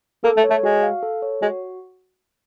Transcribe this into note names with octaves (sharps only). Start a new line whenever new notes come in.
A#3 A4
A3
C#5
A3
G#3 F#4
F5
A4
C#5
G#3 F#4